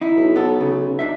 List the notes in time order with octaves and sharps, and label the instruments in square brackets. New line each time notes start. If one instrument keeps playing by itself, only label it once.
[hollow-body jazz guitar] D#4 E4
[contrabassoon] B1
[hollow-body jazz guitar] B3 A4
C#3
D4 D#4 E5